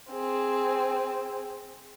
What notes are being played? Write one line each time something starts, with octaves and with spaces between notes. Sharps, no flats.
C4 G#4